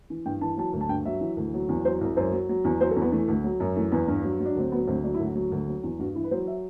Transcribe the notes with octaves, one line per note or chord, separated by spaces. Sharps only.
E3
G2 G5
E3 A5
F#3 A5
D2
A5
G2 G5
F#3 E5
E3
D2
F#3
E2
F#3 C5
C2
F#2 C5
F#3
F#3
E2
F#3 C5
A4
E2
B3
E3 A3
D2
F#3
F#2
E3 A3
E2 B3
G2
F#3
F#3
D4
D2 C4
F#3 B3
D2 C4
F#3 D4
E4
D2
F#4
F#3
D2
F#3
E2
G2 F#4
E3 E4
B4
F#3 C5
E5